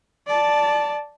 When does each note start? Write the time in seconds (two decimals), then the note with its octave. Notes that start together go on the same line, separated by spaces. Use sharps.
0.27 D5 A5